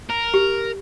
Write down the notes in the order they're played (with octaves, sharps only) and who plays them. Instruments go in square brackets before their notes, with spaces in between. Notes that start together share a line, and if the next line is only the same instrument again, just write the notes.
[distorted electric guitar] A#4
[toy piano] G4